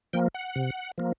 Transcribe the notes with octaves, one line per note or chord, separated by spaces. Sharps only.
F3 A#3 G5
F#5
C3
F3 A#3